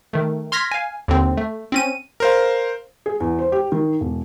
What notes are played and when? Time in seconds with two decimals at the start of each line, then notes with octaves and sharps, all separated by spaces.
0.13 D#3 A3
0.52 C6 F6 G#6 A#6 B6
0.71 F5 G#5
1.08 D#2 D3 C4
1.37 A3
1.72 C4 C#4 D#7
2.20 A#4 C5 F5
3.06 G#4
3.20 E2
3.39 C5
3.52 G4
3.72 D#3
4.01 E1